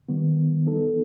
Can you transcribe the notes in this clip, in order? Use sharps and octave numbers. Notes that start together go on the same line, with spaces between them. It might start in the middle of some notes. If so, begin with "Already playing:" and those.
D#3 G3 B3
E3 B3 D#4 A4